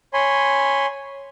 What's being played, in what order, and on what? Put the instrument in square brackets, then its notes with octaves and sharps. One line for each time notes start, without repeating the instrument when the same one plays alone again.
[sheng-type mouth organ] C#5 G#5 B5 C6